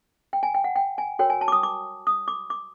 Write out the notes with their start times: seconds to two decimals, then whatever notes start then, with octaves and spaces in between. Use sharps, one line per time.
0.33 G5
0.43 G#5
0.55 G5
0.64 F#5
0.76 G5
0.98 G#5
1.19 F#4 A#4 C#5 G5
1.30 G#5
1.41 A5
1.48 D6
1.52 D#6
1.63 D6
2.07 D#6
2.28 D6
2.50 D6